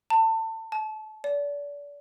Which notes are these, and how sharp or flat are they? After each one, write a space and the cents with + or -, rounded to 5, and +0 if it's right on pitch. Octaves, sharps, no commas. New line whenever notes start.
A5 +25
A5 -30
D5 -35